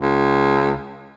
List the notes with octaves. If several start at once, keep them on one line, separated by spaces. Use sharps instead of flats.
C#2